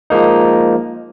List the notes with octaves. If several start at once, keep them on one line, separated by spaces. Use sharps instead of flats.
F3 G#3 A#3 D#4